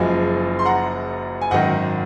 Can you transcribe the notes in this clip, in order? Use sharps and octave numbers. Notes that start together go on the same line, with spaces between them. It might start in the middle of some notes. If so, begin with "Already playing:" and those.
Already playing: F#1 F#2 F3 G#3 F5 G#5
C6
F#5 A#5
G#5
G#1 F#2 D#3 D#5 F#5